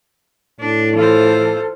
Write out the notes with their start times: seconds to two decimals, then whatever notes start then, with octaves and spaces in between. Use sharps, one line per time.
0.61 A2 D4
0.96 E3 F4 A4 C5